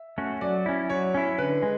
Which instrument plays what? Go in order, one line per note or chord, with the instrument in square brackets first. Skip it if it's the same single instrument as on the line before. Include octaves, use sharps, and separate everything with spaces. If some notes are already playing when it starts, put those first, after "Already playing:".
Already playing: [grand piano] E5
[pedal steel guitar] A3 C#4 F#4
[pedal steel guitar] F#3 [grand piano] D5
[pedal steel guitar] C#4 E4
[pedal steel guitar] F#3 [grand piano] C#5
[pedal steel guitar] C#4 E4
[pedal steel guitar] D3 [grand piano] B4
[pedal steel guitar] G#3